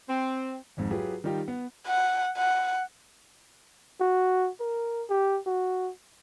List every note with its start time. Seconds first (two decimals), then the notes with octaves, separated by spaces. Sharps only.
0.09 C4
0.77 G#1 F2 G#2
0.91 F#3 F4 G4 G#4 B4
1.24 D#3 G3 D#4 F4 G4
1.48 B3
1.87 F#5
2.37 F#5
4.00 F#4
4.60 A#4
5.09 G4
5.46 F#4